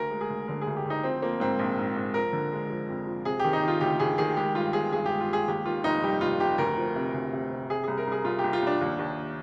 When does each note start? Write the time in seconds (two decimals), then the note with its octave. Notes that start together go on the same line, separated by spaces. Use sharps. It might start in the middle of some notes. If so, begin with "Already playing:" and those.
Already playing: D2 A#4
0.11 G#3
0.21 G#4
0.30 D2
0.48 D3 A#4
0.62 G#4
0.67 D2
0.76 G4
0.85 D2
0.90 D#4
1.03 F3 C4
1.22 F3 A#3
1.40 G#2 C4
1.59 A#1
1.78 G#2
1.96 G#2
2.14 F3 A#4
2.33 D3
2.52 G#3
2.70 F3
2.88 F2
3.07 F3
3.25 C3 G#4
3.40 G4
3.44 D#3
3.53 D#4
3.63 D#3 F4
3.81 D2 G4
4.00 D2 G#4
4.18 D#3 G#4
4.37 G#3 G4
4.55 G2 F4
4.73 G1 G#4
4.92 G2 G#4
5.06 G4
5.10 G#3
5.20 F4
5.30 G#3 G#4
5.48 D#2 G4
5.66 D#3 F4
5.84 F1 D#4
6.03 G3 G4
6.21 F1 F4
6.40 F1 G4
6.58 D2 A#4
6.77 F3
6.96 C3
7.14 D2
7.33 C3
7.52 C3
7.70 C3 G#4
7.84 C2 G#4
7.98 A#4
8.07 C2 G#4
8.24 C2 F4
8.39 G4
8.44 C2
8.53 F4
8.62 C2 D4
8.81 D#2
8.99 D#2